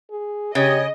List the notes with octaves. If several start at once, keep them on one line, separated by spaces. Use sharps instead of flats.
G#4
C#3 G4 C#5 D#5